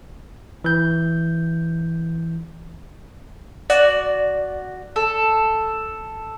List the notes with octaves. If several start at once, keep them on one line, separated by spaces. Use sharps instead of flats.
E3 G6
F#4 D5
A4